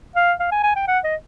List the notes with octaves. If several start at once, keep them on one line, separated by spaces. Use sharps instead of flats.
F5
F5
G#5
G#5
G5
F#5
D#5